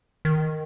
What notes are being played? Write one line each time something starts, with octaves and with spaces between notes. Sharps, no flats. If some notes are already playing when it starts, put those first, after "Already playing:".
D#3